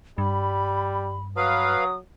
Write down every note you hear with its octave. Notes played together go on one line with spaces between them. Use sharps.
G2 G3 B5
F#3 B4 F5 D#6